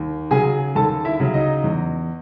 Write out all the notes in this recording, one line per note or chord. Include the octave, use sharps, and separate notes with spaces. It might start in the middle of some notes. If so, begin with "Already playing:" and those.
Already playing: D#2
C#3 F#3 G#4 G#5
D#2 A4 A5
E4 E5
C#3 F#3
D#4 D#5
E2